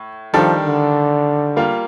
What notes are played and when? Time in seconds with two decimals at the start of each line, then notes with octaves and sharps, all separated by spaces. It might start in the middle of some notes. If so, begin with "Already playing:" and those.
Already playing: A2
0.34 D#3 F3 G3 D4 A4
0.65 D3
1.56 G3 A#3 F4